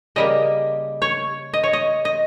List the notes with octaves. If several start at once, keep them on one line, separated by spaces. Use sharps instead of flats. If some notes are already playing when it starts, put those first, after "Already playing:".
C#3 G3 A#3 D#5
C#5
D#5
C#5
D#5
D#5